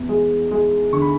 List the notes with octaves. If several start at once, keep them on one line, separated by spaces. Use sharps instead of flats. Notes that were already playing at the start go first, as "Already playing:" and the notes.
Already playing: E2
G#3
G#3
D3 C#6
B5